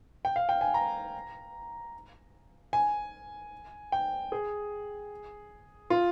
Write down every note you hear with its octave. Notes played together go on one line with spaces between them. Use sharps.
G5
F5
G5
G#5
A#5
G#5
G5
G#4
F4